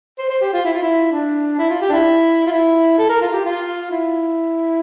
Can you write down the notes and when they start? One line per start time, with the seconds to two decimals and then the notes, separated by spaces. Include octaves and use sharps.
0.19 C5
0.30 C5
0.41 G4
0.53 F4
0.65 E4
0.73 F4
0.82 E4
1.12 D4
1.58 E4
1.70 F4
1.82 G4
1.89 D4
1.93 E4
2.47 F4
2.51 E4
2.98 A4
3.09 A#4
3.21 F4
3.33 G4
3.45 F4
3.91 E4